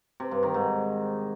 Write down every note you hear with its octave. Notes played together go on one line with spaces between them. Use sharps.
C3
G2
D#3
G#2